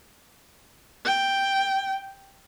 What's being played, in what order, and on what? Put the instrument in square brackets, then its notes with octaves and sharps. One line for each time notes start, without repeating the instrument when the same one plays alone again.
[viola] G5